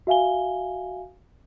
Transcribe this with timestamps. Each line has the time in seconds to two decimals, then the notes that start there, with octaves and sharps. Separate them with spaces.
0.07 F#4 E5 F5 G#5 G7